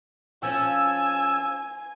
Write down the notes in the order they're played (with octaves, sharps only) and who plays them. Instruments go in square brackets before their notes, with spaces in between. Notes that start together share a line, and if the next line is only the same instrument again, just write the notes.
[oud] F3 C#4 [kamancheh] G#5 [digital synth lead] E6